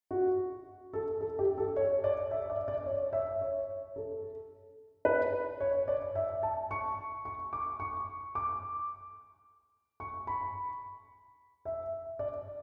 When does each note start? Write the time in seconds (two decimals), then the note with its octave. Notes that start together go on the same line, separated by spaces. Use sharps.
0.11 F#4
0.93 A4
1.21 A4
1.39 G4
1.58 A4
1.76 C#5
2.04 D5
2.31 E5
2.50 D5
2.68 D5
2.86 C#5
3.13 E5
3.41 C#5
3.96 A4
5.05 B4
5.60 C#5
5.88 D5
6.15 E5
6.43 A5
6.71 C#6
7.25 C#6
7.53 D6
7.80 C#6
8.35 D6
10.00 C#6
10.27 B5
11.65 E5
12.19 D5